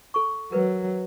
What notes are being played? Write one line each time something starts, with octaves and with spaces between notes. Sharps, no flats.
A4 C#6
F#3 A#4 B4